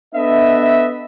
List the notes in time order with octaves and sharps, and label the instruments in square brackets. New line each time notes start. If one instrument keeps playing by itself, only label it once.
[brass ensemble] B3 D4 A4 B4 D#5 E5